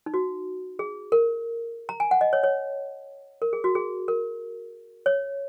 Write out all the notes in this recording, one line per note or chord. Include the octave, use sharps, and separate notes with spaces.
D#4
F#4
G#4
A#4
A#5
G#5
F#5
D#5
C#5
C#5
A#4
G#4
F#4
G#4
A#4
C#5